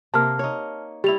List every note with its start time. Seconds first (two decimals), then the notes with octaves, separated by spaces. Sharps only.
0.14 C3 A#3 A5 F6
0.39 D#4 C#5
1.04 G3 E4 G4 F7